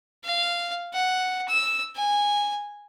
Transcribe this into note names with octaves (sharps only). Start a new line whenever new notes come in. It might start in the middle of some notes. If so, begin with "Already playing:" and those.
F5
F#5
E6
G#5